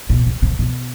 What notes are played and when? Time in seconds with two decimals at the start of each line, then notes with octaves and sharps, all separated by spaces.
0.10 B2
0.26 C3
0.42 C3
0.59 B2